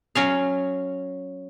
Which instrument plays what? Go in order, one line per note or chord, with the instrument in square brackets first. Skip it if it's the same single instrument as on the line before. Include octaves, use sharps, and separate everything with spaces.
[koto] F#3 C#4 F5